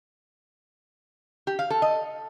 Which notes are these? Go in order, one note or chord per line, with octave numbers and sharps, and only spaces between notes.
G4
F5
A4
D#5